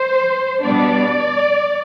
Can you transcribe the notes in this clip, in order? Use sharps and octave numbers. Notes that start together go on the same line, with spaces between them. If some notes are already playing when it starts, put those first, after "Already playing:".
Already playing: C5
B2 G3 B3 D4 D5